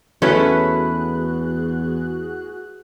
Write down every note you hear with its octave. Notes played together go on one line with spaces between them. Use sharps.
E2 A3 C#4 E4 F#4 G#4 B4 F#6